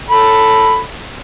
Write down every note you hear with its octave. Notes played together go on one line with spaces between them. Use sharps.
A4 B5